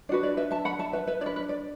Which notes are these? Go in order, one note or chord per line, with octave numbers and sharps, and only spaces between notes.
D4 F#4 B4 D5
D5
B4 E5
E5 A5
F#5 B5
E5 A5
B4 E5
B4 E5
D4 B4 D5
B4
D5